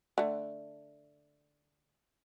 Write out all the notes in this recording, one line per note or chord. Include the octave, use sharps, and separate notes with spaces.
D3 A3